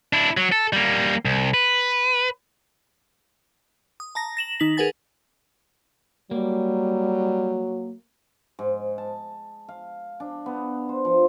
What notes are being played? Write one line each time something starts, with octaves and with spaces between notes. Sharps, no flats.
D4 E4
F#3
A4
G3 A#3
C2
B4
D#6
A5 A#5 A#6
A#6 E7 F#7
D#3 D#4 B6 F#7
G#4 A#4 B4 F#5 G#5 A6
F#3 G3 A#3
G#2
A5
F5
D4
B3
C5
F3